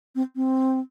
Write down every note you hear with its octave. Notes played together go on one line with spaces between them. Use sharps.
C4
C4